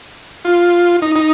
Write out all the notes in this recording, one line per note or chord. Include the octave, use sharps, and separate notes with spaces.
F4
D#4
D#4